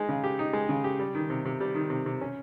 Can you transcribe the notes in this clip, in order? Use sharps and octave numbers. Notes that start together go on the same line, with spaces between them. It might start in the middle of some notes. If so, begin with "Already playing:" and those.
Already playing: G#3 D#4
C#3
G4
D#4
G#3
C#3
G4
G3
D#3
C3
C3
G3
D#3
C3
C3
C#4